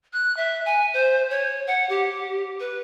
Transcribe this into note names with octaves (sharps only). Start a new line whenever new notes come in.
F#6
E5
G#5
C5
C#5
F#5
G4
B4